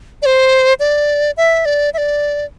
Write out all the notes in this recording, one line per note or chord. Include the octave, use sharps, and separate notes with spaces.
D5
C5
D5
E5
D5
E5
D5